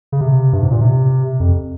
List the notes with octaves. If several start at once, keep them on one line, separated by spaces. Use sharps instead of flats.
C#3
C3
G2
G#2
A#2
C3
F2